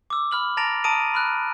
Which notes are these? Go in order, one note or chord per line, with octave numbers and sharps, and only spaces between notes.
D6 E6
B5 F6 F#7
A5 A#5 A6 A#6 D7 F7
A5 A#5 D#6 D7 D#7
B5 F6 F#6